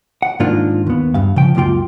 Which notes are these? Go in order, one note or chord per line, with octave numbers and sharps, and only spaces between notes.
F#5
G#2 D#3 A#3 D4 F4
D#2 B3
G2 F5
C#3 F3 G5
C#2 F#2 A#3 F4 G5